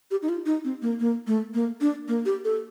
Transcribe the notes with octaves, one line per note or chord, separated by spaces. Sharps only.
G4
D#4
F4
D#4
C4
A#3
A#3
A3
A#3
D4
A#3
G4
A4